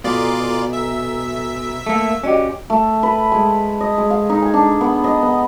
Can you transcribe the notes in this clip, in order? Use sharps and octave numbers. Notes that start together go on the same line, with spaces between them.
B2 F4 A4 D5 G#5 A#5
E5
A3 A#3 E6
C#4 F#4 G4 D5 D#5
A3
B4
G#3
D#5
G#3
F5
D#4
G#5
D4
B3
D#5
B3